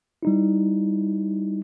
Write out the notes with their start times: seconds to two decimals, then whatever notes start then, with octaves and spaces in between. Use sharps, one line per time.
0.23 G3 D#4 E4